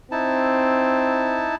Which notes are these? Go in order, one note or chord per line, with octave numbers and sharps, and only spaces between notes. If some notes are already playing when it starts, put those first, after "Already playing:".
C4 D#4 E4 A5